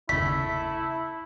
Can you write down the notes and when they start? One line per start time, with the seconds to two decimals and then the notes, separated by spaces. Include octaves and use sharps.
0.09 G1 D#2 C#3 A3 E4 B6